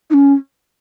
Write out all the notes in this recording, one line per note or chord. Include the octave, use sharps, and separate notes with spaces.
D#4
C#4